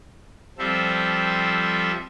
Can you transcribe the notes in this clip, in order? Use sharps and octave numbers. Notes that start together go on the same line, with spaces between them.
F3 G3 C4 A4 E5